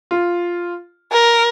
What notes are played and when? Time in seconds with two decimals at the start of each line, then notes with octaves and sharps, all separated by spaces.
0.11 F4
1.12 A#4